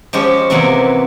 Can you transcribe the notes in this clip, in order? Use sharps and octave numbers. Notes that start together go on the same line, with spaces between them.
F3 G#3 C#4 G4
C3 E3 F#3 A#3 B3